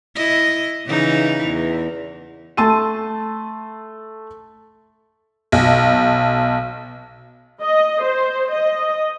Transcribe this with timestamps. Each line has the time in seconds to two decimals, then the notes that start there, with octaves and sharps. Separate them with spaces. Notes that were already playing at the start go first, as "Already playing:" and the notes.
0.15 E4 D#5
0.86 C#3 E3 D#4
1.46 E2
2.57 A3 A5 C6 E6 D#7
5.52 B1
7.62 D#5
8.04 C5
8.52 D#5